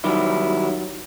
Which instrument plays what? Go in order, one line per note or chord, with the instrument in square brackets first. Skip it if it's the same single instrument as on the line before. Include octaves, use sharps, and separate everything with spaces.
[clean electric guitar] D#3 G3 E4 [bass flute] F#3